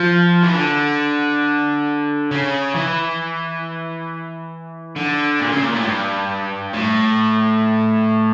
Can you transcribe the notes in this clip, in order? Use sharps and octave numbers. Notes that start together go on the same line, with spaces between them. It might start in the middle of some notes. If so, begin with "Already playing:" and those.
Already playing: F3
E3
D3
C#3
E3
D3
A#2
C#3
A#2
A2
G2
A2